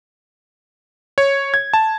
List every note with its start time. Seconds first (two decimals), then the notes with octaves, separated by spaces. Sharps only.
1.18 C#5
1.54 G#6
1.74 A5